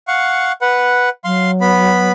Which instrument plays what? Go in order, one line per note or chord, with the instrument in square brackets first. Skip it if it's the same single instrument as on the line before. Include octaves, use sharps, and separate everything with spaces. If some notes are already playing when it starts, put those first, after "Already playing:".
[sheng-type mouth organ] F5 F#5 C#6
B4 F#5
[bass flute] F#3 [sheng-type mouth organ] F5 C6
[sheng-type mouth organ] B3 B5